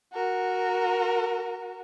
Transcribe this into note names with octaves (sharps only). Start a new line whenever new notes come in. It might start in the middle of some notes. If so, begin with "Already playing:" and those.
F#4 A#4